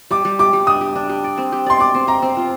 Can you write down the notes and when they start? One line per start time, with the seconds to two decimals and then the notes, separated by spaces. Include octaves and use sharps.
0.11 G3 D6
0.25 G3
0.39 G4 D6
0.53 G3
0.67 D4 D#6
0.81 G4
0.95 D4
1.09 G4
1.24 D5
1.38 C4
1.52 G4
1.66 D5 C6
1.79 D5 D6
1.95 C4
2.07 C4 A#5
2.22 C4
2.37 F4